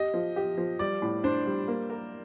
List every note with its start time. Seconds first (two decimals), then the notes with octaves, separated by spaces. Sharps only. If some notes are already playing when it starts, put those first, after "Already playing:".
Already playing: G4 D#5
0.14 F3
0.36 G4
0.58 F3
0.79 G3 D5
1.02 A2
1.24 D4 C5
1.46 G3
1.68 A#3
1.90 A#4